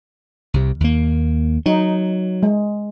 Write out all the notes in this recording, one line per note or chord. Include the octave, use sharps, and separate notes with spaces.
C2 C3
D#2 A#3
F#3 D#4
G#3